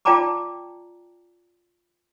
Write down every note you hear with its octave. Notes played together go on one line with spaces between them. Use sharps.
F4 D5 G5 A5 A#5 D6